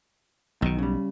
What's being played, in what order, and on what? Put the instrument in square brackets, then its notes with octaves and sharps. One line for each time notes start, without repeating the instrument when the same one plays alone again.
[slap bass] B1 B2 [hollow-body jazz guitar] D#3
[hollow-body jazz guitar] C#3 G3